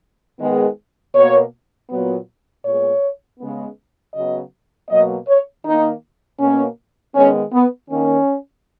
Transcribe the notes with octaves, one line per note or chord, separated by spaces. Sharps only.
D#3 G#3 B3
B2 A#3 C#5
A#2 F#3 B3
A#2 G#3 B3 C#5
C#3 G#3 B3
C#3 F#3 B3 D#5
B2 F#3 A#3 D#5
C#5
D#3 A#3 D#4
B2 A#3 C#4
D#3 G#3 B3 C#4
B3
D#3 A#3 C#4